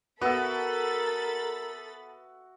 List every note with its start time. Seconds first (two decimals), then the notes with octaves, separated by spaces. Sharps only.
0.21 B3 F#4 A4 A#4 E5 B5 A6